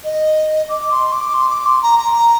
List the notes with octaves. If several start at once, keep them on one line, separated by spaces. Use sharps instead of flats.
D#5
D6
C6
D6
C6
D6
C6
A#5
A#5